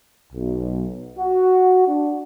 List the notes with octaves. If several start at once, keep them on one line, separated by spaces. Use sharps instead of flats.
B1
F#4
D4